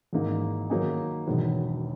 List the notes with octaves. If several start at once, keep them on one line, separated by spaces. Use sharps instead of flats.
G#1 G#2 E3 A#3 D#4
D#3 F#3 A#3 D#4 G#4
E1 E2 D#3 F#3 B3